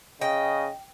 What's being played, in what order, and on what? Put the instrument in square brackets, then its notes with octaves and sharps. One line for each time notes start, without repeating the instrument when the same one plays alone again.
[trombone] C#3 [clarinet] D#5 [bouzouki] G5